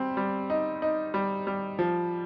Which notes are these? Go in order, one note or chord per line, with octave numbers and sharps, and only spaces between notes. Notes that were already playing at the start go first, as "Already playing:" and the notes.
Already playing: G3 C4
G3
D#4
D#4
G3
G3
F3